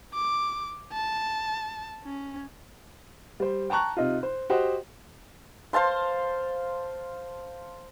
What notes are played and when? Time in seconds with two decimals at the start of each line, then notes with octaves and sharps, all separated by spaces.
0.14 D6
0.93 A5
2.04 C#4
3.40 G3 C5
3.70 G5 A5 A#5 C#6 F#6
3.97 C3 D#4 F4
4.23 C5
4.50 F#4 G4 C5 D#5
5.73 C5 F5 A5 C6